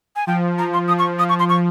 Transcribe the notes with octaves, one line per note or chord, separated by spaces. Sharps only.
G#5
F3 G5
F3 A#5
C6
F3 D#6
C#6
F3 D#6
C#6
C6
C#6